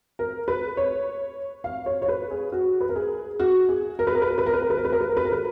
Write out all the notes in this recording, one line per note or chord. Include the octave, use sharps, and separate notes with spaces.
A#4
B4
C#5
F5
C#5
C#5
B4
G#4
F#4
B4
A#4
G#4
F#4
G#4
A#4
B4
A#4
B4
A#4
B4
A#4
B4
A#4
B4
A#4
B4
A#4
B4
A#4
B4
A#4
B4